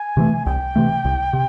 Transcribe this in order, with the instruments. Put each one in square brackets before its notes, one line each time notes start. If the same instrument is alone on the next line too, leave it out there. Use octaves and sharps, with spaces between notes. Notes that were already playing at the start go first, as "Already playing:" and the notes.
Already playing: [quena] G#5
[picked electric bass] C3 E3 A3
[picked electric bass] C2 [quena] G5
[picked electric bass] C3 E3 A3
C2
C3